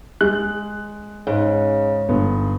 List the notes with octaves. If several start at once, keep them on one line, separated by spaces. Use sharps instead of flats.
G#3 F#6
G#2 C#3
G1 B3